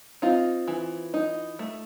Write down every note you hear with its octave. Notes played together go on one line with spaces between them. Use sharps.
C4 D#4 F4
E3
D#4
A3